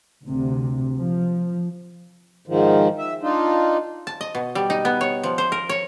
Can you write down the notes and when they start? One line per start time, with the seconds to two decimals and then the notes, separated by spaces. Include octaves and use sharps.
0.25 D2 C3
0.98 F3
2.47 G#2 D#3 F3
2.99 E5
3.22 D4 D#4 F4
4.07 A5
4.21 D#5
4.35 B2
4.55 G3
4.70 D#4
4.85 B3
5.01 C#5
5.24 F3
5.38 C5
5.52 A#4
5.69 C#5